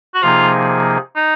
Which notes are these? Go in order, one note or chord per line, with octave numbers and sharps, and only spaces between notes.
F#4
C3 F3 A#3 D#4 F4 G#4
D#4